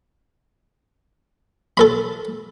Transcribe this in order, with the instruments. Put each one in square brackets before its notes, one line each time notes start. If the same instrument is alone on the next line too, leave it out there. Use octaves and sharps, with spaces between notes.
[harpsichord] A4 A#4 B5